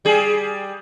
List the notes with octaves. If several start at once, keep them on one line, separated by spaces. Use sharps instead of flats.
G3 G#4